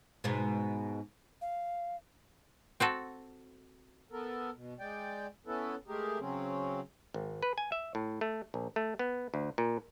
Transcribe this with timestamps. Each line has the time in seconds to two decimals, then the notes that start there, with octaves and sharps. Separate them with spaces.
0.24 G#2 B2
1.41 F5
2.80 C4 F#4 A4
4.11 B3 A4 A#4
4.55 B2
4.79 G#3 D5 G5
5.46 B3 C#4 E4 A4 B4
5.88 G#3 A3 G4 G#4 A#4
6.19 C#3 F#3 C4 C#4
7.14 G#1
7.43 B4
7.58 G#5
7.72 E5
7.95 A2
8.21 A3
8.54 A#1
8.76 A3
8.99 B3
9.34 D2
9.58 A#2